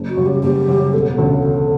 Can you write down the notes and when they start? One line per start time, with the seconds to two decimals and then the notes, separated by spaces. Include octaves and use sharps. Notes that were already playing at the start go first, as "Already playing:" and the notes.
Already playing: F#1
0.09 F#4
0.17 F#2 C#3 G3
0.26 G4
0.43 F#1 G4
0.68 F#2 C#3 G3
0.94 E1 A4
1.18 D2 C#3